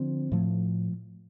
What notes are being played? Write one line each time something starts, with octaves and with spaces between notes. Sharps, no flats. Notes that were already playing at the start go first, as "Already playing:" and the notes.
Already playing: D3 F3 C4
A2 F3 A3